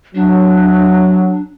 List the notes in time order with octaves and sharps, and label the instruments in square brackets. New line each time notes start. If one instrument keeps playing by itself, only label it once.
[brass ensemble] F#3 [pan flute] D4